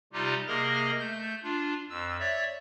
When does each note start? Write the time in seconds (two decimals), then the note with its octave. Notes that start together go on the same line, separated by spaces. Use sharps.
0.13 C3 G3 D#4 F4 G4
0.47 C3 A#3 G#4 A#4 D#5 A#6
0.99 A3 G6
1.43 D4 F4
1.89 F2 E6
2.19 C#5 D5 E5